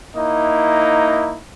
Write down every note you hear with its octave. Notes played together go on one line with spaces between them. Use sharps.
A#3 D#4 E4 D#5